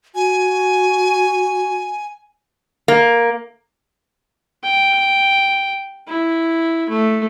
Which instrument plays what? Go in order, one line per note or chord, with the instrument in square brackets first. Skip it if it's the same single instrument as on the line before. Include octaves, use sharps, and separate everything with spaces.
[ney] F#4 [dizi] G#5
[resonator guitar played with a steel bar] A#3
[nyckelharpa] G5
E4
A3